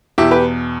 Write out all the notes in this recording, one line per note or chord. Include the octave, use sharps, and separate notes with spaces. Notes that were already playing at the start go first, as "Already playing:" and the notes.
E2 B2 E4 G4
G4 B4